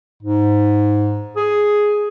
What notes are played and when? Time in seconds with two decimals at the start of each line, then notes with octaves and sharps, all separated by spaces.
0.23 G#2
1.37 G#4